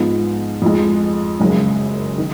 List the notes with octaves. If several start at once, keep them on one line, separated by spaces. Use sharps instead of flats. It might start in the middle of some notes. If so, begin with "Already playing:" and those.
Already playing: G#2 F3 B3 D#4
F2 F3 G#3
F#1 F#2 C#3 G#3
D#3